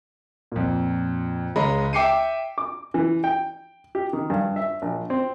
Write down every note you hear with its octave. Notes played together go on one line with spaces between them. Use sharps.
F2 A#2
C#2 G#3 C#5 D#5 A#5 B5
E5 G5 D6 C7 C#7 D#7
D6
E3
G5
G4
D#3
G2
E5
A#1
C4